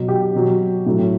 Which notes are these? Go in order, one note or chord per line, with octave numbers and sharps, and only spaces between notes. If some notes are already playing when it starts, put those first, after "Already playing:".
Already playing: B2 F#3
G4
B2 F#3
A2 F#3